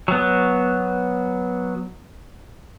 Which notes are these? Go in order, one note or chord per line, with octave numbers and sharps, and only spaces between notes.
F#3 B3